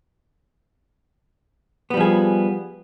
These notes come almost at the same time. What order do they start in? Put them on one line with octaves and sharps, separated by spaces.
B3 G3 F3 G#4